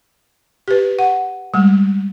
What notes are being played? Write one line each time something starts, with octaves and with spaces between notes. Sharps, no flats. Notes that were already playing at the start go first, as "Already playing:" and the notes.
G4 B4
F#5
G3 G#3